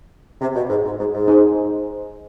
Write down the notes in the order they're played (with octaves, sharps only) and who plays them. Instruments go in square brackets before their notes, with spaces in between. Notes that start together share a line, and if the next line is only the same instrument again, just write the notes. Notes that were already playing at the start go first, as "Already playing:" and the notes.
[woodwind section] C3
B2
G#2
G#2
G#2
G#2
[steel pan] D#4 G#4 C5